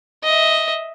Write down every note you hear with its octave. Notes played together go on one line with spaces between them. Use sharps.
D#5 E5